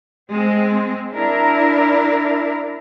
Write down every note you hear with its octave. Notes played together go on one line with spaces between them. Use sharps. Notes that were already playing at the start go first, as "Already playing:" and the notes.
G#3 C4
D4 E4 A#4